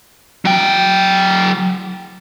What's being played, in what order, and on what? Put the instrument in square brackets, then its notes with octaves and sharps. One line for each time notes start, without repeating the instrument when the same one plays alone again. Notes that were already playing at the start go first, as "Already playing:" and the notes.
[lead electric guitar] F#3 G5